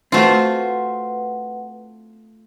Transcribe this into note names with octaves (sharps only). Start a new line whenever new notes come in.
A3 C4 F4 F#4 B4 C5 F#5